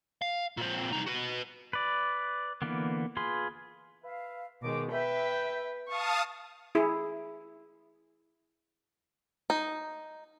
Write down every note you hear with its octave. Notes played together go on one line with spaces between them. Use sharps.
F5
A#2 C4
C2 D#4
F#4 B4
B4 D5
D3 E3 A#3 B3
F4 G#4 B4 C6
B4 E5 F5
D#2 B2 D#3 G#3 A#4 D6
B4 E5 G5
F5 A5 C#6 D#6
E4 G#4
D#4